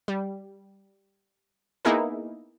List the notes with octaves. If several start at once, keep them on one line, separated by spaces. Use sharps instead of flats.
G3
A#3 B3 D#4 E4 G#4 A#4